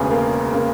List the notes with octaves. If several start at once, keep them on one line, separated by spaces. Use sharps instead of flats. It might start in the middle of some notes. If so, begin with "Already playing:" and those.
Already playing: E1 D2 C#3 B3
A#3
C#3 A#3